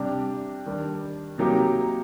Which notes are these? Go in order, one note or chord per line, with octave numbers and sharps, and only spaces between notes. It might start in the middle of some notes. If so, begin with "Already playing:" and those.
Already playing: C3 G3 D4 G4
D#3 G3 D4
C3 F#3 A#3 D#4 G4